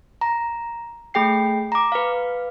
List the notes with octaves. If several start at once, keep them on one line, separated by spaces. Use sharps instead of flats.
A#5
A3 G#4 G5 C7
A#5 D6
B4 F5